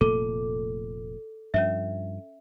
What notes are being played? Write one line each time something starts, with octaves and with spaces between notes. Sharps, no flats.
F1 A#2 A3 A4
G2 F3 C#4 E5